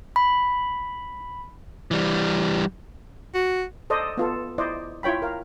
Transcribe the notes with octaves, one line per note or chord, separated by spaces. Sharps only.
B5
E3 G3
F#4
A4 C5 D5 D#5
B3 F4 A4
E4 C5 D5 D#5
E4 F4 C#5 G5 B5
A#4 F5